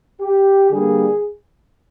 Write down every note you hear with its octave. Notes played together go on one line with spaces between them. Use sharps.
G4
D3 G3 A#3 G#4